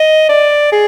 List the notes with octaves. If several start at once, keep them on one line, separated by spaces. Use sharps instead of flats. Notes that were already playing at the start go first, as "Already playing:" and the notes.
Already playing: D#5
D5
G#4